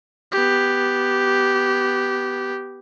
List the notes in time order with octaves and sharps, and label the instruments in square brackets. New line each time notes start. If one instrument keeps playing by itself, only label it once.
[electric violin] B3 G4